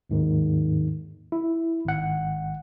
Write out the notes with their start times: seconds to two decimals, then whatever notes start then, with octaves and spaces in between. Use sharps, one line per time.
0.10 D#2 G#2 D#3
1.32 E4
1.85 G#1 F#5